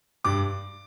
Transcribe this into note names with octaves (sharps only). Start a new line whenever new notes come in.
G2 D6